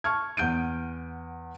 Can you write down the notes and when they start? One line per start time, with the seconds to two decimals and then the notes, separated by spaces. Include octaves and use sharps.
0.04 A5 C#6 F6 G#6
0.37 E2 F#5 G6 D7 D#7